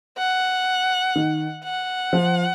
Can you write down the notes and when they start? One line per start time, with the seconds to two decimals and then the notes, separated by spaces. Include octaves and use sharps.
0.18 F#5
1.16 D#3
1.64 F#5
2.13 F3